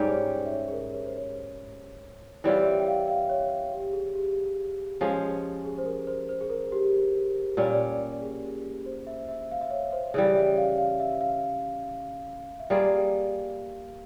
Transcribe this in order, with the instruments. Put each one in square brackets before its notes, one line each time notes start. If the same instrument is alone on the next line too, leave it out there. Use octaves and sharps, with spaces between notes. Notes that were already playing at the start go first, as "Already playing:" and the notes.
Already playing: [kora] G#2 G3 C#4 G4 [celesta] C5
[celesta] C#5
E5
C#5
G#4
A#4
C#5
C5
C#5
[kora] E3 G3 C4 F4 [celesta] C#5
[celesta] E5
G5
F5
F5
C#5
G4
G#4
G4
[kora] F3 G#3 C#4
[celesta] G#4
C5
A#4
C5
C5
G#4
A#4
G4
[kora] A#2 G3 C#4
[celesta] G#4
C5
E5
E5
F5
E5
C#5
C5
[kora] C#3 E3 G3 [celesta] C#5
[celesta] E5
F5
F5
E5
F5
E5
[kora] G3 A#3 F4 G#4 [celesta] F5